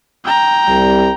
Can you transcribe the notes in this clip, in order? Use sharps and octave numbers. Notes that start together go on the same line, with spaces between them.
G5 A#5
C2 G3